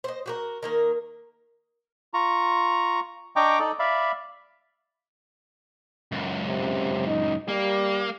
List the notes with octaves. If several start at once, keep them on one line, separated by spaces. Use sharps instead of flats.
C5 D#5
F#4 G4 A#4
D#3 A#3 A#4
F4 A#5 C#6
D4 D#5 G5 A#5 C#6 D6
D#4 A4 D5 D#5
D5 E5 F5 B5
C#2 F#2
C3
D#4
G3 A#3